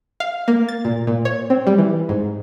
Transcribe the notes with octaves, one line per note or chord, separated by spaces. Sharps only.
F5
A#3
A6
A#2
A#2
C#5
C4
G3
E3
G#2